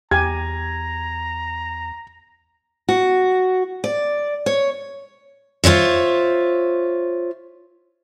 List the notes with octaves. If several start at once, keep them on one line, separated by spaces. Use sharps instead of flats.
E2 G4 G#5 A#5 G#6
F#4
D5
C#5
F4 C5 C#5 E5